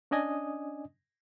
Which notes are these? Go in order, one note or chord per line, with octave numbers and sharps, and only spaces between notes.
C#4 D4 D5 D#5 G#5 D#6